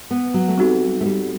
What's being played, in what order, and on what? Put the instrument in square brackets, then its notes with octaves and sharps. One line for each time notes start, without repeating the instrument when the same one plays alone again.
[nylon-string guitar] B3
F#3
A3
[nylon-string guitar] G3 [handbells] C4 D#4 F#4 A4
[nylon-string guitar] A3
G3